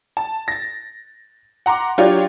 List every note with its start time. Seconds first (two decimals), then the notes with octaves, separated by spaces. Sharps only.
0.17 A5
0.48 A6 A#6
1.66 F#5 A#5 C6 D6
1.98 F#3 D4 F4 G4 C#5 D5